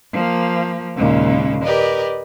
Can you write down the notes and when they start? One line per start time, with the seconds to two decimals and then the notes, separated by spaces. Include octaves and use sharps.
0.12 F3 A#3
0.95 D#2 A#2 C#3 G#3
1.63 G4 A#4 B4 D5 D#5